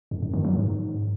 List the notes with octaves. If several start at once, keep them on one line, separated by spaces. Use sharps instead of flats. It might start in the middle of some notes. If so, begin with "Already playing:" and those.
F#2
F#2
D#3
F#3
G#2